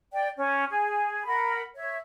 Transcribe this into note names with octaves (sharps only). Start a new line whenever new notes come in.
D5 G5
C#4
G#4
A#4 F#5 B5
C#5 E5